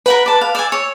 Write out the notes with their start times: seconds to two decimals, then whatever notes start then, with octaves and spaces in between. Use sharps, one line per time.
0.06 A#4 B4 F#5 B5
0.26 D5 A5
0.41 F5
0.55 D5 G#5 E6
0.72 C#5